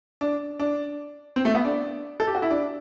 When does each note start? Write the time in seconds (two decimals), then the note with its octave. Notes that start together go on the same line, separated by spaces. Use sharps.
0.21 D4
0.59 D4
1.36 C4
1.45 A3
1.55 B3
1.65 D4
2.20 A4
2.27 G4
2.35 F#4
2.42 E4
2.51 D4